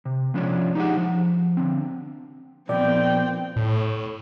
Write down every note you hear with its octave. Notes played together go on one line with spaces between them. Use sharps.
C3
F3 G#3 C#4 D4 F4 C#5
D#4 G4 G#4 F#5
F3
D3 C4
A#2 F3 B3 C4 D5 G5
A2